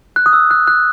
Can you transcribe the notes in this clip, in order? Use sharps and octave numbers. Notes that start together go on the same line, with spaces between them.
F#6
D#6
E6
F#6
F#6